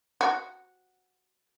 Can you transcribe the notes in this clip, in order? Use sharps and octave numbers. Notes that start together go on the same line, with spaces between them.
F#4